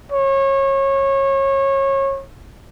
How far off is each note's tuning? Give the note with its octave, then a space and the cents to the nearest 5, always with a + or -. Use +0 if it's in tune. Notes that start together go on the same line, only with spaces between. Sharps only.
C#5 -25